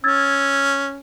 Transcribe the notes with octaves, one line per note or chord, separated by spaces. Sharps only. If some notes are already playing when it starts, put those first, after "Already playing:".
C#4 E6 G#6 A6